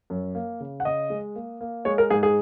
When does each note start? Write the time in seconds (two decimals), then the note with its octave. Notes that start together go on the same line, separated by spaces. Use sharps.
0.10 F#2
0.35 A#3
0.60 C#3
0.80 F#5
0.85 C#3 D#5
1.10 G#3
1.35 A#3
1.61 A#3
1.85 G#3 C#5
1.98 A#4
2.10 G#2 G#4
2.23 G#4